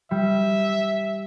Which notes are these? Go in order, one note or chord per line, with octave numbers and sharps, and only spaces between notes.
G3 E5